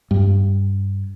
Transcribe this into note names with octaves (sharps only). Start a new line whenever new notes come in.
G2